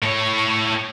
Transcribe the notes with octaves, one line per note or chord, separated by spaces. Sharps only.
A2 C#5